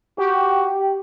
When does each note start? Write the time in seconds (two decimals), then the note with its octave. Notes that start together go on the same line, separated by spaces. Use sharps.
0.18 F#4 G4